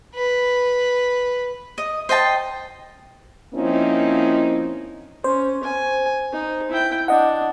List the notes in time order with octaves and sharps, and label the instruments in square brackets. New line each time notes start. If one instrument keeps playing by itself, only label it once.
[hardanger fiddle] B4
[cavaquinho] D#5
C5 D#5 G5 A5
[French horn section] F3 A#3 C4 C#4 D#4 E4
[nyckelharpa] C#4 [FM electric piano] C5
[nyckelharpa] G#5
D#4
E4 G5
[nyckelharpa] D4 [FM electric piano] D#5 F#5